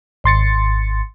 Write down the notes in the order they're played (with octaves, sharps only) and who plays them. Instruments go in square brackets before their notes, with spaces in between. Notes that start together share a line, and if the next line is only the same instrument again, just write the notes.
[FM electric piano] G#1 C6 A6 C#7